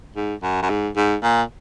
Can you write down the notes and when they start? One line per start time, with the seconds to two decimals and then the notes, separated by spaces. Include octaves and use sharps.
0.16 G#2
0.43 F#2
0.62 F#2
0.69 G#2
0.96 G#2
1.23 A#2